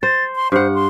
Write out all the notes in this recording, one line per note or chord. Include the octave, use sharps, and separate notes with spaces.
C5 A6
C6
G2 C5 F#5
C6